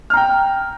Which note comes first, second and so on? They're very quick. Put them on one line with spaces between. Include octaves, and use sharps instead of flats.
F6 A#5 G5